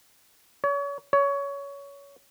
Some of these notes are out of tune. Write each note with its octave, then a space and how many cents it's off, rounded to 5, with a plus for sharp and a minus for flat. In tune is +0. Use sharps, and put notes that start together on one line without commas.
C#5 +35
C#5 +20